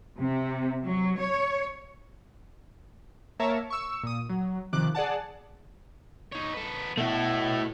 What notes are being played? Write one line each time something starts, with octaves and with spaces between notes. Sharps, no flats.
C3
F#3
C#5
A#3 A#4 C#5 E5 A5
C#6 E6
A#2 D#6
F#3
C3 D#3 F3 D6 F#6
G#4 D5 F#5 A5
D#4 C#5
B3 A4
B2 A3 E4